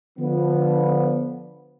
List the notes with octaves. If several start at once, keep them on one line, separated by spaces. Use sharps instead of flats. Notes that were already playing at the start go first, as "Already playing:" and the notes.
D3 F3 B3